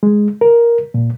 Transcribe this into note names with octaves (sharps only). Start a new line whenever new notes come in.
G#3
A#4
A#2